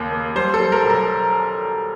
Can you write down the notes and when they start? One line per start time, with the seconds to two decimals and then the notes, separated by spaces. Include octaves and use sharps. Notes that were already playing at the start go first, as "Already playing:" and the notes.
Already playing: D#2 C#3 A#3
0.11 A#3
0.36 G3 C5
0.54 A4
0.60 G3
0.72 A#4
0.84 B1
0.90 A#4